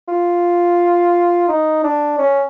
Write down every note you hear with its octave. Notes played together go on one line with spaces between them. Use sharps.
F4
D#4
D4
C#4